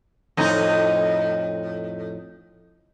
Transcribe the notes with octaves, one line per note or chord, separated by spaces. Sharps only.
F2 A2 D#4